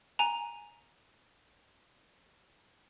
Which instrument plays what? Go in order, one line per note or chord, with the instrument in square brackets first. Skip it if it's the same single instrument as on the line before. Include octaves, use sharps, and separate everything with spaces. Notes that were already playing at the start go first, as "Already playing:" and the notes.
[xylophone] G#5 A#5